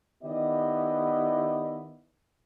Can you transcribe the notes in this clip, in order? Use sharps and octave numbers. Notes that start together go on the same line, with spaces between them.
D#3 B3 E4 G4 D5 D#5